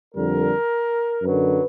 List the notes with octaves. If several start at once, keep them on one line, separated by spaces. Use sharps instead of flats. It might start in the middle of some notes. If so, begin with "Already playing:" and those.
F2 D3 G3 A#4
F#2 D3 F#3 B4